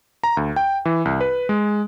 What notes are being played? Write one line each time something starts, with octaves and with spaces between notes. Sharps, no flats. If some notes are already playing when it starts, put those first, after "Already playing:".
A#5
D2
G5
E3
C2
B4
G#3